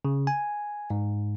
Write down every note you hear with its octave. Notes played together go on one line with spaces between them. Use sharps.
C#3
G#5
G#2